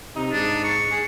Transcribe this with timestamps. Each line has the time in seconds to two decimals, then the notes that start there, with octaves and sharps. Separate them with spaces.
0.17 C3 D#4
0.32 G#2 D4
0.64 C#6
0.92 G#4